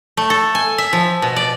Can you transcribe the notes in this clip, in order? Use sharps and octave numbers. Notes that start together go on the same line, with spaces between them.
A3
A4
G#5
E5
F3
B2
D5